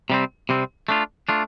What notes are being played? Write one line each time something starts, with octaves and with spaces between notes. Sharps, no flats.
C3 G3 C4
C3 G3 C4
A3 D4 F4
A3 D4 F4